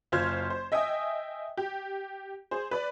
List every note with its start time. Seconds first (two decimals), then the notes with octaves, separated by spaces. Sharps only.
0.12 F#1 F4 C5 F6 G#6
0.50 C5
0.72 D#5 E5 G5 G#5 D#6
1.57 G4
2.51 G#4 C5
2.71 B4 D5